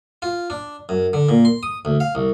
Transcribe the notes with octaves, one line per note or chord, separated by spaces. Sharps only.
F4
D4
F#2
D3
A#2
C6
D#6
D2
F5
C2